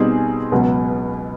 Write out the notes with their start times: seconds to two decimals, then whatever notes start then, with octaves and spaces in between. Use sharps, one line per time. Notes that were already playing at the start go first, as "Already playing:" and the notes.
Already playing: B2 G3 C4 D#4 G#4
0.52 C#2 B2 F#3